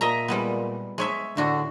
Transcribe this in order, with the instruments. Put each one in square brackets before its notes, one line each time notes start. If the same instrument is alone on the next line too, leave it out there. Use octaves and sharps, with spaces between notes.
[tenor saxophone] A#2 [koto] D#5 E5 A#5
[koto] G3 G#3 B3
G#3 C#5 E5
[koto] A2 F#4 [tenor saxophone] D3